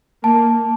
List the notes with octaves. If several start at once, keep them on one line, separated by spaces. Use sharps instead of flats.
A#3 A5